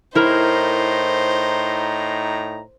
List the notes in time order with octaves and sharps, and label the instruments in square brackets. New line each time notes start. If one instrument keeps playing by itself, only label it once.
[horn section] A2 D#4 A#5 [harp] E4 A#4 [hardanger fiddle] C5